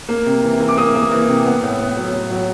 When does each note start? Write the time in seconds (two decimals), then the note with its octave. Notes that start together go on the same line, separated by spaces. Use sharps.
0.09 A#3
0.26 C3
0.43 E3
0.60 E3
0.69 D6
0.77 A#3 D#6
0.95 A#3
1.12 E3
1.28 C3
1.45 B3
1.63 A2
1.80 B3
1.97 F#3
2.13 A2
2.30 F#3